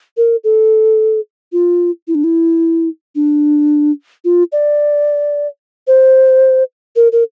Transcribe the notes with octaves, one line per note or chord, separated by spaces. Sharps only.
A#4
A4
F4
E4
D4
E4
D4
F4
D5
C5
A#4
A#4